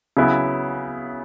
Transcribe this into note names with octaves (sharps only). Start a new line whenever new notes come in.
C#3 F#3 B3 E4